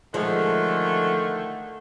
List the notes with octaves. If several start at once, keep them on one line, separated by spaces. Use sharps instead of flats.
D3 D#3 F3 G#3 A3